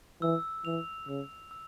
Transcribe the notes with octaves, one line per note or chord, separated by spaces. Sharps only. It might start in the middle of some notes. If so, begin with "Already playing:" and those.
E3 E6
E3 F7
C#3 E6
E6